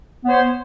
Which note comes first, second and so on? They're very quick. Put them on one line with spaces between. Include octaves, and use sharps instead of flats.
B3 C#5 C5